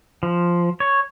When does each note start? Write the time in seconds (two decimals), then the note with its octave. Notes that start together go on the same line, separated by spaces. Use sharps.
0.23 F3
0.80 C#5